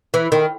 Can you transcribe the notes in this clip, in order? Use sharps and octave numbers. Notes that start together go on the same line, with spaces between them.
E3
D#3